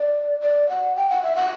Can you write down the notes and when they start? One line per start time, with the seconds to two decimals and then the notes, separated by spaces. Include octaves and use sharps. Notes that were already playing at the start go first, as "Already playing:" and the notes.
Already playing: D5
0.41 D5
0.69 F#5
0.96 G5
1.10 F#5
1.23 E5
1.36 F#5